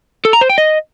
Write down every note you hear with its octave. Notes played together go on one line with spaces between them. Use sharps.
A4
A#5
C5
G5
D#5